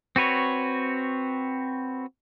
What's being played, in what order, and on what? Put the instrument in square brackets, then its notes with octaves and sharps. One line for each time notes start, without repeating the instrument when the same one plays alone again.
[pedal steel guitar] C4 F#4 B4 C#5